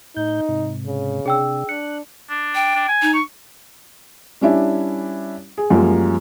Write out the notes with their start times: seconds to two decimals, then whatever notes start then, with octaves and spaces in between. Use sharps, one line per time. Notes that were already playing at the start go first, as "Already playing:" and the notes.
0.17 A2 D#4 G6
0.49 G#2 C3
0.86 C#3
1.26 C3 D4 G#4 G5 E6
1.69 D4 F#6 C#7
2.30 D4
2.55 G5
2.75 D4
2.88 G#5
3.02 D#4
3.14 C#6
4.41 G3 C#4 D4 E4
5.58 G#4
5.70 F#2 F3 G3 G#3 A#3